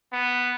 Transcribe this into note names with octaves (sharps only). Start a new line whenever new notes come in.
B3